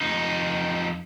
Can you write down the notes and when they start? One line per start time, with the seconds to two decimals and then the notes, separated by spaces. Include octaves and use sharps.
0.01 F2 D#4